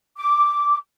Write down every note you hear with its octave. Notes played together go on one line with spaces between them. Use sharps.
D6